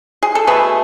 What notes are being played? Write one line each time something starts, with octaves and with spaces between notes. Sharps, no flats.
G#4
A4
B2 A3 G#4 B4